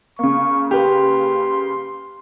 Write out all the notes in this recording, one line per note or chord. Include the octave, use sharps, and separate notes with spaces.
C#3 A#3 C#6
G4 B4 C6